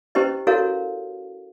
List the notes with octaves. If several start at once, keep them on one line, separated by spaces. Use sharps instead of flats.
C#4 E4 G4 B4 C5 D#5
E4 F#4 A4 A#4 C#5 F5